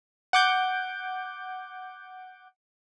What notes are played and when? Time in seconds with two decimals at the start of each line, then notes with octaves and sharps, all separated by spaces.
0.33 F#5 D6 G6